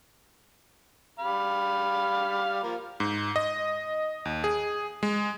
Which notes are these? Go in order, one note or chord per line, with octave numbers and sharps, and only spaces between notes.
G3 F5 B5
F3 A#3
G#2
D#5
D#2
G#4
G#3